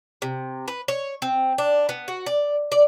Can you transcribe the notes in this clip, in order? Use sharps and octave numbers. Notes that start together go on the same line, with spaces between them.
C3
B4
C#5
C4
D4
B3
F#4
D5
D5